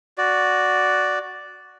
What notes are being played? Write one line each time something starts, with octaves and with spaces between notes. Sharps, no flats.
F#4 D5